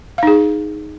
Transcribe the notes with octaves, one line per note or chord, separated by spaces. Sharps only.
D#4 G#4 F5